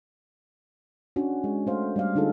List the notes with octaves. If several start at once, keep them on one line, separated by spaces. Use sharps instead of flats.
C#4 D4 F#4
G#3
A3 C5 F5
G3 A3 D5 F5
D3 D4 D#4 F4 G#4 A4